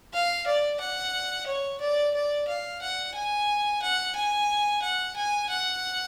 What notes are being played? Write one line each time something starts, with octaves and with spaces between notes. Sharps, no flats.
F5
D5
F#5
C#5
D5
D5
F5
F#5
G#5
F#5
G#5
F#5
G#5
F#5